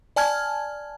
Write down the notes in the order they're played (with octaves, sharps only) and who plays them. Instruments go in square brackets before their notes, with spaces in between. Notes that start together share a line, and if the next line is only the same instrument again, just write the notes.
[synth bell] D5 G#5 A5 F6 G#6